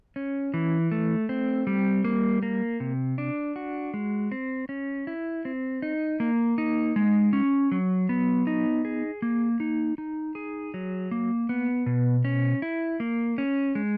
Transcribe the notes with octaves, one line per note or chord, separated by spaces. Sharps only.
C#4
E3
A3
C4
G3
A#3
A#3
C3
D4
F#4
G#3
C4
C#4
E4
C4
D#4
A#3
D#4
G#3
C#4
F#3
B3
D#4
G#4
A#3
D#4
D#4
G#4
F#3
A#3
B3
B2
C#4
E4
A#3
C#4
G#3